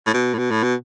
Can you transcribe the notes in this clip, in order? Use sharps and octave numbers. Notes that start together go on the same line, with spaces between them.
A2
B2
A2
B2
A2
B2